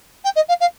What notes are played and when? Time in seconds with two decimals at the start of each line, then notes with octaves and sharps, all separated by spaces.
0.24 G5
0.36 D#5
0.48 F5
0.60 F5